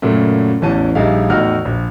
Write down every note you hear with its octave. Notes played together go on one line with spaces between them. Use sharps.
F#2 A#2 C#3 F#3 A3
A1 E2 E3 C#4 A5 D#7
A#1 G3 D#4 G#4 E5 F5
E2 A2 D#4 F#4 F6
A#1